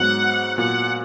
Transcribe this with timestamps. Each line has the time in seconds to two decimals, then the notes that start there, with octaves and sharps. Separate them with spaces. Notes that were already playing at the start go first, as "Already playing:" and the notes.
Already playing: G#2 F#3 B3 F#5
0.57 A#2 F#3 B3 F#5